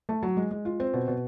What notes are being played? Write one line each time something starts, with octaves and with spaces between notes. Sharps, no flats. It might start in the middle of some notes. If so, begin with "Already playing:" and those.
A3
F#3
G#3
G#3
F4
C4
B2
B2